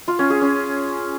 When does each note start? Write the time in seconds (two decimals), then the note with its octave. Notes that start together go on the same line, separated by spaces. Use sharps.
0.08 F4
0.19 C#4
0.30 G#4
0.42 C#4